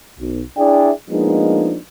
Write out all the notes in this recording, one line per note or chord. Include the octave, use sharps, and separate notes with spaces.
B1
D4 E4 G#4 D5 E5 G5
F3 G#3 A#3 B3 D4 D#4